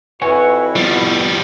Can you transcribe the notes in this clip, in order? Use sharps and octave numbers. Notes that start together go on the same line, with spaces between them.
F2 E4 F#4 B4 C#5 F#5 G#5
F3 G3 B3 F4